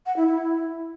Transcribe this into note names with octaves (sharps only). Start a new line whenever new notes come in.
F#5
E4
E4